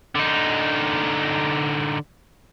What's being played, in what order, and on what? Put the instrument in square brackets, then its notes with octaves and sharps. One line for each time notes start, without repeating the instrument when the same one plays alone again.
[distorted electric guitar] D3 D#4